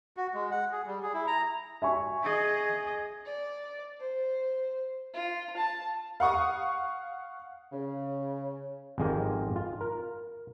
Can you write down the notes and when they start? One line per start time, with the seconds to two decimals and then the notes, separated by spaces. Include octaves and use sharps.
0.17 F#4
0.34 G#3
0.51 F#5
0.72 G#4
0.87 G3
1.03 G#4
1.14 E4
1.27 A#5
1.82 E5 G#5 C#6
2.23 G#4 D#5
3.25 D5
3.99 C5
5.13 F4
5.56 A5
6.20 F5 F#5 C#6 D#6
7.72 C#3
8.98 G#1 F2 G#3 F4 G4 A#4
9.56 F4
9.81 A#4